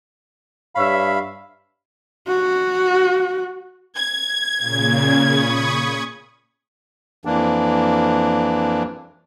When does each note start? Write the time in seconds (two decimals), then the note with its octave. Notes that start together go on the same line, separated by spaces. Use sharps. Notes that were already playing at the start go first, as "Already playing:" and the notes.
0.75 G2 C#5 E5 F5 B5
2.27 F#4
3.97 G#6
4.58 A#2 C#3
5.18 B5 C#6 D#6
7.25 F2 E3 A#3 D4